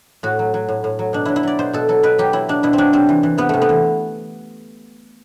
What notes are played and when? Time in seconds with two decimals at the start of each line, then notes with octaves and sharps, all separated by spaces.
0.23 A2 F#4
0.39 F#3
0.54 F#3
0.69 A2
0.84 A2
0.99 F#3
1.13 B2 D4
1.25 F#3 E4
1.36 E4
1.43 F#3 D5
1.59 B2 C5
1.73 B2 A4
1.89 F#3 A4
2.03 B2 B4
2.18 F#3 G4
2.33 F#3 E4
2.49 B2 D4
2.63 B2 E4
2.73 C4
2.78 F#3 D4
2.93 C3 C4
3.09 E3
3.23 E3
3.38 C3 B3
3.49 C3 A3
3.62 B3
3.69 E3